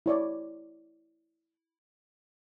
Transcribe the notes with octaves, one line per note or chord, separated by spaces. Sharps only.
E4 C#5 D5